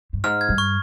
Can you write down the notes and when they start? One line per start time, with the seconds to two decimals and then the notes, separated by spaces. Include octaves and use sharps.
0.13 G2
0.24 G#2 F6
0.41 G#6
0.49 G2
0.58 C#6